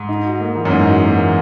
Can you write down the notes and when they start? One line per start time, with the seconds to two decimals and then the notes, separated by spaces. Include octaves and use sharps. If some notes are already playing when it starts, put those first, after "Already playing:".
Already playing: G#2
0.08 D#4
0.24 F#4
0.40 A#3
0.55 E3
0.65 F#2
0.71 G#2 D#4
0.87 F#4
1.03 A#3
1.19 E3